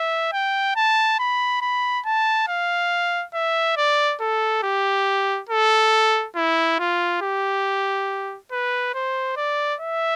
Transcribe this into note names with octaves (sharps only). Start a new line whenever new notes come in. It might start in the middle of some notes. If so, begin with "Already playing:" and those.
Already playing: E5
G5
A5
B5
B5
A5
F5
E5
D5
A4
G4
A4
E4
F4
G4
B4
C5
D5
E5